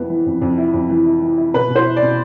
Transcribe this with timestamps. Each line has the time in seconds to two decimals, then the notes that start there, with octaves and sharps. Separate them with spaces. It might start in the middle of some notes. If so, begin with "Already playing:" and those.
Already playing: F2 B3 E4
0.10 E3
0.26 F2
0.42 F2
0.58 E4
0.74 F2
0.89 E3
1.06 E4
1.22 E3
1.38 E4
1.54 B2 B4
1.69 B2
1.75 C5
1.86 E4
1.96 D5
2.03 B2